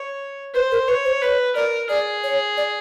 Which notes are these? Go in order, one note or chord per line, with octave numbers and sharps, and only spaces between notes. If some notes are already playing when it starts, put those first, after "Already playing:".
Already playing: C#5
B4 C5
A#4
B4 C#5
C5
B4 C#5
A#4 D5
G#4 D5
C#5
D5